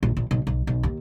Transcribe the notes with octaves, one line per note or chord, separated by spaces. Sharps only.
A#1
A#1
B1
B1
B1
D#2